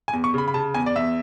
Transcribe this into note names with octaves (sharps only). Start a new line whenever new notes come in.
G#5
E2
C#6
C#3 B5
B5
C#3 A5
E2 G#5
D5
E2 E5